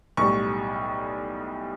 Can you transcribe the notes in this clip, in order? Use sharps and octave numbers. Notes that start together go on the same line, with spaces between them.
B1 A2 G3 C#6